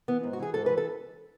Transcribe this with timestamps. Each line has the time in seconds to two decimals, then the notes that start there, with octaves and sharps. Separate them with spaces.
0.08 E3 B3
0.23 G#2
0.33 F#4
0.39 E3 G#4
0.54 G#2 A4
0.66 E3 B4
0.78 A4